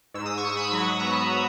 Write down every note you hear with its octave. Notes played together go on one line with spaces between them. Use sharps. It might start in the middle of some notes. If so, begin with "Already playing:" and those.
G#2 E6
D#6
C#6 E6
G#2
C#6
B5 D#6
F#3
B3 A#5 C#6